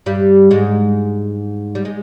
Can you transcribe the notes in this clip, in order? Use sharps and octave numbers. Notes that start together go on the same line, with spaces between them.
G2 G3
G#2 G#3
G3
G#3